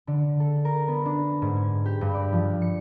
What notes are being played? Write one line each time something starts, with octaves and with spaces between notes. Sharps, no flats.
D3
A4
A#4
B3
D4
G#2
G#6
G4
G2
D5
F3
C#7